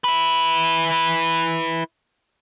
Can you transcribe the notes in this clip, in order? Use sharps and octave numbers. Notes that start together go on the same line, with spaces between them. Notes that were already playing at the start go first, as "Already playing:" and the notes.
E4 B4